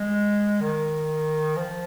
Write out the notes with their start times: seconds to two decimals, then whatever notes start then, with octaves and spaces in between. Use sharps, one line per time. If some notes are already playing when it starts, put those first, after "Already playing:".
Already playing: G#3
0.61 D#3
1.56 F3